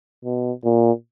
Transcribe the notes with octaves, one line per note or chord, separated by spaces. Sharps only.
B2
A#2